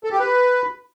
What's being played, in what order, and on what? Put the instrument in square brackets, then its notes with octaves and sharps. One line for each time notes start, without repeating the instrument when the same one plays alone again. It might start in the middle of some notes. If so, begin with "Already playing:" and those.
[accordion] A4
G4
B4